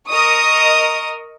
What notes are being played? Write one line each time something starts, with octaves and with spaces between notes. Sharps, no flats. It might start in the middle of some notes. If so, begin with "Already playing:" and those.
A#4 D#5 C#6 D#6